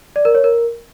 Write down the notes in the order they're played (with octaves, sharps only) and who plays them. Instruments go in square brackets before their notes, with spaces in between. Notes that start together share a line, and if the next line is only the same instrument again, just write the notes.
[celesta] D5
A#4
C#5
A#4